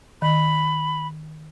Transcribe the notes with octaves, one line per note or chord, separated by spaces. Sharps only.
D#3 B5